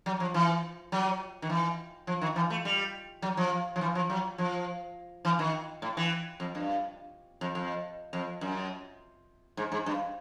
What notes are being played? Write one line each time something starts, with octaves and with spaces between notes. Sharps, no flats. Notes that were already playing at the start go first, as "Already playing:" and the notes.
F#3
F3
E3
F#3
D#3
E3
F3
D#3
E3
A3
G3
F#3
F3
F3
E3
F3
F#3
F3
E3
D#3
A2
E3
F2
G2
F2
F2
F2
F#2
G#2
G#2
G2